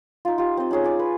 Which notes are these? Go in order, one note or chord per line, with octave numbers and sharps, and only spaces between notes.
D#4 F4
F4 G4
C4 D#5
C#4 D#4 G#4 C#5
D5 G#5
B4